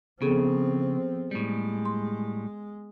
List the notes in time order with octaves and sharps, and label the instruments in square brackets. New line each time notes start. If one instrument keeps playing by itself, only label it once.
[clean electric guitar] C#3 [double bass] F3 C4 [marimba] B3 G#4 A4
[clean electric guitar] A2 G3 [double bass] G#3
[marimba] C6